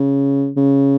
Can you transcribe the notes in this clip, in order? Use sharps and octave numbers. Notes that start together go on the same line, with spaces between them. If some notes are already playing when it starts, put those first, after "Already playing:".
Already playing: C#3
C#3